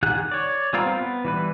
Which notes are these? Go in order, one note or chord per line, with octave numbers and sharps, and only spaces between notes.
D#3 G4 G#4 F#5 F#6
C#5 D5
G3 B3 C4 F4 A#4
B3
E3 G3 B4